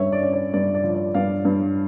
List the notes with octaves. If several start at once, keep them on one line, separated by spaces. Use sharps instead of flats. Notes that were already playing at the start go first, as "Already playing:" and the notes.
Already playing: G2 C#4 C#5 E5
D5
C#4
C#5
G2 D5
D5
F3
D5
G2 D5 F5
G2